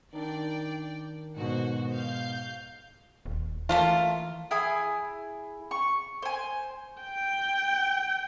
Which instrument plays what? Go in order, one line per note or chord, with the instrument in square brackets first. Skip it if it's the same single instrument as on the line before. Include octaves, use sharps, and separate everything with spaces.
[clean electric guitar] D#3 D4 [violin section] D5 G5
[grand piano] G#2 B2 [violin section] F#4 C5
[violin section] F5 G6
[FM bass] D#1
[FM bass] E3 [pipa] A3 A#3 F4
[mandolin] E4 G#4 G#5 D#6
C#6
C5 G#5
[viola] G5